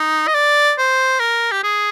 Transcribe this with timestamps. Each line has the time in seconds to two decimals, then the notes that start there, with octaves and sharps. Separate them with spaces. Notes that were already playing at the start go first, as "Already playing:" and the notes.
Already playing: D#4
0.27 D#5
0.34 D5
0.78 C5
1.20 A#4
1.52 G4
1.63 G#4